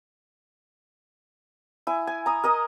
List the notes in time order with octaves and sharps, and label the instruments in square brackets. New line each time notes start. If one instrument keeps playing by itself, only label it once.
[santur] E4 G#5
G#5
A#5 D#6
A#4 D#5 D#6